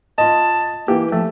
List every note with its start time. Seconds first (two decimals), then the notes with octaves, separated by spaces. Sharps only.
0.18 F4 D#5 A5
0.88 E3 A#3 G4
1.12 F3 A3